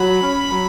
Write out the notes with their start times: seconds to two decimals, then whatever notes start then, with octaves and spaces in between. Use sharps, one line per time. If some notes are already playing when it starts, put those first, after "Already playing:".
Already playing: F#3 B5
0.22 C#4
0.51 F#3